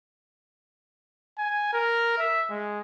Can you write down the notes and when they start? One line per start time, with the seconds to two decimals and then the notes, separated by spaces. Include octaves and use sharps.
1.38 G#5
1.73 A#4
2.18 E5
2.50 G#3